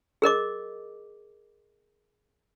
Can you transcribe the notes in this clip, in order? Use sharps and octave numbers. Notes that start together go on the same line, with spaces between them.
G#4 A#4 D#5 D6